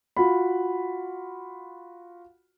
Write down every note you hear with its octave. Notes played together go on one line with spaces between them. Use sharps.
F4 F#4 B5